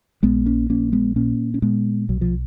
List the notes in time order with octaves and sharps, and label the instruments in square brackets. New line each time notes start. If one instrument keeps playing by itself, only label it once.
[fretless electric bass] A#1 G#3 B3
A#3 C#4
A#1 A#3 C#4
G#3 B3
A#2 A#3 C#4
C#4
A#2 G#3 B3
B1 F#3
F3